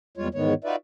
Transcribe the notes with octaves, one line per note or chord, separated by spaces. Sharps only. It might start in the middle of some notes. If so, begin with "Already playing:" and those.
E2 G3 G#3 F4 C#5
E2 G#2 D#3 G#3 B3 C#5
D#4 F4 F#4 B4 D5 E5